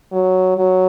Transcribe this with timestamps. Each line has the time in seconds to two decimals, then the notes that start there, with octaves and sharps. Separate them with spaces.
0.12 F#3
0.57 F#3